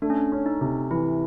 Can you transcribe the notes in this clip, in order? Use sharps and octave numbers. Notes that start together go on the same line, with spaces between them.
A3 D4
C#4
D4
C#4
D#4
C3
E3 E4